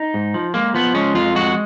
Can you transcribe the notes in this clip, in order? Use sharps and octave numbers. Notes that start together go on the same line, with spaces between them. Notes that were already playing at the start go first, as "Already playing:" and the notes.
Already playing: D#4
G#2
F3
G#3 A#3
F3 B3
G#3 C#4
F2 F4
G#3 F#4